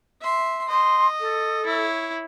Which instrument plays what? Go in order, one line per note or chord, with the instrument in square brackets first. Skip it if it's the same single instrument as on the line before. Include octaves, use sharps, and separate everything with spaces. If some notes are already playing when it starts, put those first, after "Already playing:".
[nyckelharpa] E5 C6
[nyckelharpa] D#5 [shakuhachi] C6
[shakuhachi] A4
[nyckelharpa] E4 C#5